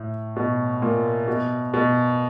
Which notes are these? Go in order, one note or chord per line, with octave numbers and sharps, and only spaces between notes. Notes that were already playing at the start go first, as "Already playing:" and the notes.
Already playing: A2
B2
A#2
B2
B2